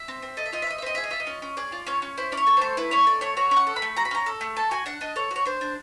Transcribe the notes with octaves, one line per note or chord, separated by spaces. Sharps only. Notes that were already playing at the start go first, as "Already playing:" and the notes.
Already playing: E5
C4
C4
A4 D#5
E5
F4 D#5
E5
C4 D#5
E5
C4 D#5
G#4 E5
D#5
F4 E5
D#5
C#4
C#4
G#4 D5
F4
C#4 C#5
C#4
E4 C5
C#4 D5
C#5
A4
A3 C5
E4 B4
C#4 C#5
A4 D5
A3 C#5
F#4 C#5
C#4
F#5
A4
B5
A3
F#4 A#5
B5
C#4 A#5
A4
A3
A4 A5
F#4 G#5
D4 F#5
D4 D#5
A4 C#5
F#4 C#5
D4 C5
D4